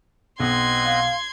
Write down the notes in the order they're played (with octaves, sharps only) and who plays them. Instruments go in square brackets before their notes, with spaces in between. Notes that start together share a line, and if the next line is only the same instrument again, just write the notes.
[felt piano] B1 [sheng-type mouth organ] C4 D#5 F#5 [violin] C6 G#6
[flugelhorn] F5